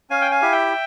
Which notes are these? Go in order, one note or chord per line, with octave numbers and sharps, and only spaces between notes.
C#4 F5 G#5
G5
F5 G#5
E4 G4
E5 G5